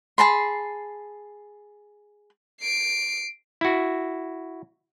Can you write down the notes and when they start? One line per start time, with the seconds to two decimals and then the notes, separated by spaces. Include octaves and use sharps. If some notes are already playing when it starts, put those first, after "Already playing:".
0.18 G#4 A5 B5 C6
2.61 C7 D7
3.61 E4 F#4